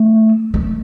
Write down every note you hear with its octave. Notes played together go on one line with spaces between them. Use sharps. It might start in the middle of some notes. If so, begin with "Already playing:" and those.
Already playing: A3
A3